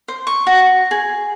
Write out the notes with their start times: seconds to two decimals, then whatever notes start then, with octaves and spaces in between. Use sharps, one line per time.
0.08 C5
0.27 C#6
0.47 F#4
0.91 G#4